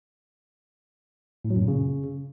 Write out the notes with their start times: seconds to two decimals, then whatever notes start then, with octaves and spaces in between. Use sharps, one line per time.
1.45 A2
1.50 F#3
1.56 F#2
1.62 A#2
1.68 C#3